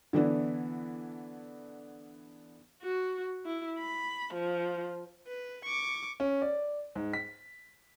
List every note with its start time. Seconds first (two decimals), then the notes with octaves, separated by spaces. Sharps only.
0.13 D3 E3 B3 D4 E4
2.82 F#4
3.45 E4
3.79 B5
4.34 F3
5.27 B4
5.64 C#6 D6
6.20 C#4
6.42 D5
6.95 G#2
7.13 B6